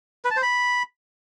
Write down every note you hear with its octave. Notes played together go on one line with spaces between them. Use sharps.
B4
A5
C5
B5